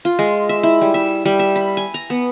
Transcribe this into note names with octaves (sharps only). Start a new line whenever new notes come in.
F4
G#3
E5
E4
G3
E5
G3
E5
B5
G#5
A#5
B3